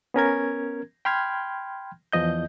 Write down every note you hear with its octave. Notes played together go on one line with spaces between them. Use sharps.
B3 C#4 A#4 G#6
G5 B5 C6 F6 G6 G#6
E2 F3 D#5 G6